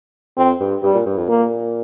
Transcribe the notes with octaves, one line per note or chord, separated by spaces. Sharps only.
F2 C4
G2
G2 G3
A#2
G2
F2
A#2 A#3